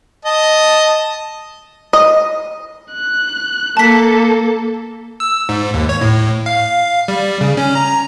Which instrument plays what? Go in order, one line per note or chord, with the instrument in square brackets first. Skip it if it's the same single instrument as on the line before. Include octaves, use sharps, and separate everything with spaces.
[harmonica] D#5 A5
[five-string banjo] D#5
[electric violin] F#6
[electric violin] A#3 A4 [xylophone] A5 B6
[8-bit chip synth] E6
G#2
D#2
C#5
A2
F5
G3
C#3
C#4
A#5